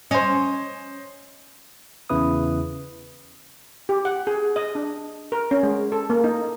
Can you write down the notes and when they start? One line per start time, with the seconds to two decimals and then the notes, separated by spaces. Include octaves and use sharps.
0.11 C#4 C5 D#5
2.09 E2 C#3 E4 B4 D#6
3.89 G4
4.05 F#5
4.27 G#4
4.56 D#5
4.75 D4
5.32 A#4
5.51 C#4
5.63 G#3
5.92 A4
6.10 A#3
6.24 D#4